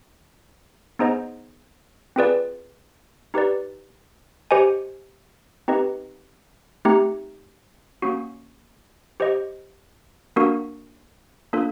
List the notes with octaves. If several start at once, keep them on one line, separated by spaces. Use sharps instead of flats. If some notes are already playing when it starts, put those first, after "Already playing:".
B3 D#4 G#4 C5 D#5
C4 F4 G#4 B4 D5
D#4 G4 B4 D5
G4 C5 D#5 G#5
C4 D#4 G4 B4 D#5
A3 C4 D#4 G4
A#3 C#4 F#4
G4 C5 D#5
A#3 D4 F#4 A#4
A#3 D4 F4 A4